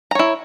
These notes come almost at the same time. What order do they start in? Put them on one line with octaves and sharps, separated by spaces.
A#5 C#5 E4